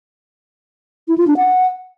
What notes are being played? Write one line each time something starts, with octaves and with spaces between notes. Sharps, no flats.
E4
F4
D4
F#5